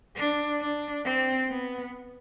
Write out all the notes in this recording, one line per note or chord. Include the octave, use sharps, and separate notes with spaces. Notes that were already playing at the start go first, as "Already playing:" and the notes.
D4
D4
C4
B3